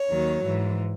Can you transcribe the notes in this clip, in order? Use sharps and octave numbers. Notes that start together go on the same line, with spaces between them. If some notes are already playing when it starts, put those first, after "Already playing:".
Already playing: C#5
D#2 D#3 F#3
G#2 E3